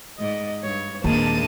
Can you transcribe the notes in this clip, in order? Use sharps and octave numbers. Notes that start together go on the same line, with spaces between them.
G#2 D5 D#5
G2 C#5
D#2 A#2 G#3 C4 D4 A#4 A5 D#7